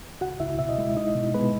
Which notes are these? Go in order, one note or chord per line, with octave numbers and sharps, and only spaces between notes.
C#2 F#4 F#5
C#2 E4 E5
B2 E5
D#5
G#3 E4 E5
D#4 E4 D#5
B2
G#3 B3 B4